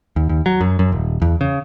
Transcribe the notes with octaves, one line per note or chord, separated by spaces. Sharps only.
D#2
D#2
F#3
F#2
F#2
D#1
E2
C#3